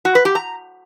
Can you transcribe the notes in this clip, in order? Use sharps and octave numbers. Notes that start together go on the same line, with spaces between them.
F#4
B4
G4
A#5